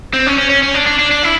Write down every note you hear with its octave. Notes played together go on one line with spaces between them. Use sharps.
C4
C#4
C#4
C#4
C#4
D4
D4
D4
D4
E4